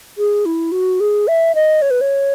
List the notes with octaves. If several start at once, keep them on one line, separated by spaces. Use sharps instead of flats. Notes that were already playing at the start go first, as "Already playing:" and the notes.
G#4
E4
F#4
G#4
E5
D#5
C#5
B4
C#5